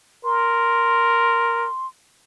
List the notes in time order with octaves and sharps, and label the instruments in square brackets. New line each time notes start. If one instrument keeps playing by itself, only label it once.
[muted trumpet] A#4 [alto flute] C6